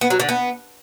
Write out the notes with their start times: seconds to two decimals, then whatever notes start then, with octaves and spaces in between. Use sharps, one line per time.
0.01 B3
0.10 F#3
0.20 D3
0.29 B3